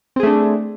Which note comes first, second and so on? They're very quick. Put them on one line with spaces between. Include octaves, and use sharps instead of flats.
C4 G#4 A3 D4